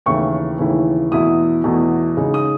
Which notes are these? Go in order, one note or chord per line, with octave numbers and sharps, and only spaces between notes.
D#2 C#3 E3 A3 E4 C#6
D#2 C#3 E3 A3 E4
E2 B2 A3 E4 D#6
E2 B2 A3 E4
C#3 G#3 D#4
D#6